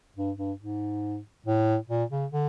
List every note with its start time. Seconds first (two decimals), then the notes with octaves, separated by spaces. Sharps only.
0.16 G2
0.38 G2
0.59 G#2
1.46 A2
1.89 A#2
2.11 C#3
2.32 D3